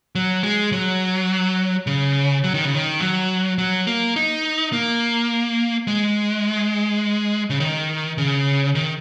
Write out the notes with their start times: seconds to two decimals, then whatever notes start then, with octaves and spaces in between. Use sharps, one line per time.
0.15 F#3
0.43 G#3
0.72 F#3
1.87 C#3
2.44 F#3
2.54 D#3
2.64 C#3
2.74 D#3
3.01 F#3
3.58 F#3
3.87 A#3
4.16 D#4
4.73 A#3
5.88 G#3
7.50 C#3
7.60 D#3
8.18 C#3
8.75 D#3